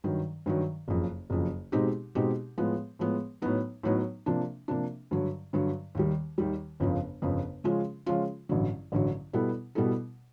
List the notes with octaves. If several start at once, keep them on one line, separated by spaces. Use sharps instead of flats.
G2 D#3 F#3
G2 D#3 F#3
F#1 F2 C#3
F#1 F2 C#3
B2 G#3 C4 D#4 G4
B2 G#3 C4 D#4 G4
A2 F3 G#3 B3
A2 F3 G#3 B3
A2 F#3 B3 D#4
A2 F#3 B3 D#4
C3 F3 A#3 D4
C3 F3 A#3 D4
G2 D3 F#3
G2 D3 F#3
D#2 D#3 G3
D#2 D#3 G3
G1 F2 C#3 F3
G1 F2 C#3 F3
C#3 F3 G#3 C#4 F4
C#3 F3 G#3 C#4 F4
A1 G2 D3 F#3
A1 G2 D3 F#3
B2 G3 B3 E4 A4
B2 G3 B3 E4 A4